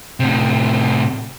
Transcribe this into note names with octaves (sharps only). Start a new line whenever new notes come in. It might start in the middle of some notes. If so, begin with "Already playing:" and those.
A2 C3